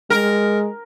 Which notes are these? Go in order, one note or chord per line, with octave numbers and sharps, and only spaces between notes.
G#3 A#4